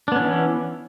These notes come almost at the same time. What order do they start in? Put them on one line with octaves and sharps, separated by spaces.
D4 B3 C#4 E3